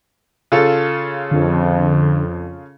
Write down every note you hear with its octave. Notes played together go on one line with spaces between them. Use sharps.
C#3 F4 A4
F2 D3